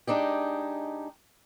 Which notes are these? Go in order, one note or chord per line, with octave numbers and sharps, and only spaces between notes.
G#3 D4 D#4 G4